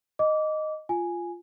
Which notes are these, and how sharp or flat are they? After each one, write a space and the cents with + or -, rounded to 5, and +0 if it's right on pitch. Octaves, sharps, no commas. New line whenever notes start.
D#5 -5 D6 -20
F4 -5 G#5 +0